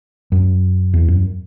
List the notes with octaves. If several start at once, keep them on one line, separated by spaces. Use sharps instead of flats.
F#2
E2
F#2